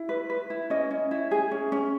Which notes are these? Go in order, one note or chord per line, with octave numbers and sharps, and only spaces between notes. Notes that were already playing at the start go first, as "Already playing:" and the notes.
Already playing: E4
B4
B4
E4
C#4 D#5
C#4
E4
G#4
C#4
C#4